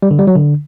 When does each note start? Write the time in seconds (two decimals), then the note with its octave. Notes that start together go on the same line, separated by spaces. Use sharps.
0.03 G3
0.11 D3
0.19 G3
0.27 F#3
0.36 D3